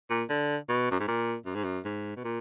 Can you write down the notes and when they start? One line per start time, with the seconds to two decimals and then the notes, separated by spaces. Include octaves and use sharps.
0.10 A#2
0.30 D3
0.69 B2
0.91 F#2
1.00 G#2
1.08 A#2
1.46 F#2
1.55 G#2
1.64 F#2
1.85 G#2
2.16 B2
2.24 A#2